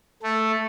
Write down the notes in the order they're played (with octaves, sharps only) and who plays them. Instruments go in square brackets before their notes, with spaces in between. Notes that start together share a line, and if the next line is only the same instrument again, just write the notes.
[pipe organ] A3